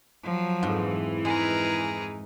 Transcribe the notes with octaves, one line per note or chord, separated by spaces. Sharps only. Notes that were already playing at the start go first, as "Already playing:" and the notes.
F3 F#3
F2 G#2 E3
G#3 D#4 G#4 A#4 B4